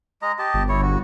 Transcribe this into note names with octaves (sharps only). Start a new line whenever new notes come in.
G#3 D#5 A#5
G4 D#5 A5
G1
E4 C#5
F#4